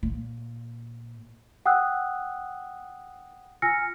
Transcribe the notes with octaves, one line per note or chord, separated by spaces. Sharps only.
A#2
F#5 G5 D#6 E6 F#6
F4 G#5 E6 F6 A#6 C#7